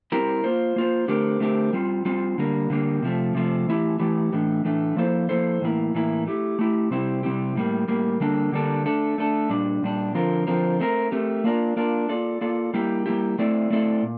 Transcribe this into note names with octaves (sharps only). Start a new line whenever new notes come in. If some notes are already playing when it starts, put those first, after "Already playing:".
G3 C4 E4 G4 A#4
A#3 F4 C5
A#3 F4 C5
D3 A3 C4 G4 A#4
D3 A3 C4 G4 A#4
G3 C4 F4
G3 C4 F4
D3 G3 A#3
D3 G3 A#3
C3 F3 A3
C3 F3 A3
E3 A3 E4 G4
E3 A3 E4 G4
A2 E3 A3 D4
A2 E3 A3 D4
F3 A#3 E4 A4 C5
F3 A#3 E4 A4 C5
A2 E3 A#3 E4
A2 E3 A#3 E4
A3 E4 G4
A3 E4 G4
C3 G3 C4 E4 G4
C3 G3 C4 E4 G4
A2 G3 A#3
A2 G3 A#3
D3 G3 A#3 D4 A4
D3 G3 A#3 D4 A4
A3 D4 A4
A3 D4 A4
A#2 G3 D4
A#2 G3 D4
D3 F3 C4 F4 A#4
D3 F3 C4 F4 A#4
A3 C4 G4 A#4
A3 C4 G4 A#4
A#3 D4 F4 A#4 D5
A#3 D4 F4 A#4 D5
A#3 F4 A4 D5
A#3 F4 A4 D5
G3 A#3 E4 G4
G3 A#3 E4 G4
A3 C4 E4 A4 D5
A3 C4 E4 A4 D5
A#2